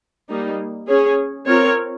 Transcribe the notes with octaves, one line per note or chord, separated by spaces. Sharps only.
G3 A#3 D#4
C#4 G#4 C#5
C4 F4 A#4 C#5